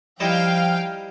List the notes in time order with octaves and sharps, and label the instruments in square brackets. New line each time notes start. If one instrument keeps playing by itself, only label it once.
[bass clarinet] F3 [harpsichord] G3 D#4 E4 [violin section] F5 G5